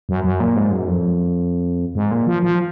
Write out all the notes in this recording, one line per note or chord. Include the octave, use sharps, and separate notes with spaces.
F#2
F#2
A#2
G#2
F#2
F2
G#2
A#2
F3
F3